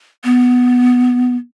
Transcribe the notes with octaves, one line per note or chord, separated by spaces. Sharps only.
B3